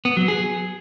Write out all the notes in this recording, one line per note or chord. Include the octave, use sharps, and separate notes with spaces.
B3
F#3
G#4